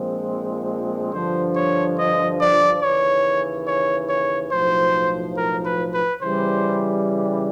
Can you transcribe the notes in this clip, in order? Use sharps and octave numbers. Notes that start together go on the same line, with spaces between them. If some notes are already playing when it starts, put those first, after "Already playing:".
Already playing: A#1 A#2 F3 G#3 C4
G2 D3 F3 C5
C#5
D#5
D5
D#2 C#3 E3 C#5
C#5
C#5
B1 A2 F3 C5
A#4
B4
B4
C#3 E3 G3 C5